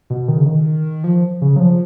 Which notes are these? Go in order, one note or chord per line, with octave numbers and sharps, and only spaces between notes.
B2
D#3
C#3
D#3
F3
C#3
F#3
F3